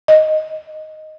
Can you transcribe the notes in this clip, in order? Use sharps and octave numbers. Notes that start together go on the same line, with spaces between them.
D#5